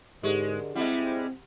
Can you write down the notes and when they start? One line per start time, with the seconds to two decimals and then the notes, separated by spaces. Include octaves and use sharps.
0.23 G#2 D3 G#3 G4 A#4 D5
0.75 G3 G#3 C4 E4 F#5 A5